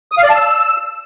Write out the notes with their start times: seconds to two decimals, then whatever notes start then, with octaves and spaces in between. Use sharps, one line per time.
0.12 D#6
0.18 F5
0.24 D5
0.30 A5
0.36 E6